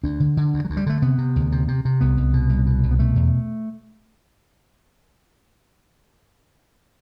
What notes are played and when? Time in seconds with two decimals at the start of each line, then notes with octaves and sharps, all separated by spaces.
0.04 D2 D4
0.20 D3
0.37 D3
0.54 D2
0.65 F#3
0.70 D2
0.77 G3
0.86 D3 A3
1.02 C3 B3
1.18 C3
1.36 D2
1.52 C3
1.68 C3
1.85 C3
2.01 C2 B3
2.17 C2
2.34 B2
2.50 C2
2.66 B2
2.83 C2
2.91 B3
2.99 B2 A3
3.16 E2